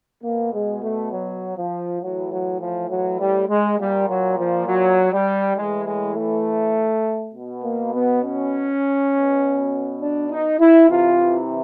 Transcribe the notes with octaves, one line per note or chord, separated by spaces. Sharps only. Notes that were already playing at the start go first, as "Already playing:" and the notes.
B2 A#3
G#3
A3
F#3
F3
A2 E3 F#3
F#3
F3
F#3
G3
G#3
A#2 G3
F#3
F3
F#3
G3
A2 E3 G#3
G#3
A3
B2
A#3
B3
C#4
B2
D4
D#4
E4
C3 E3 F4